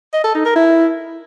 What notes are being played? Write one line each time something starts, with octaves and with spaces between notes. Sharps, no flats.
D#5
A4
D#4
A#4
E4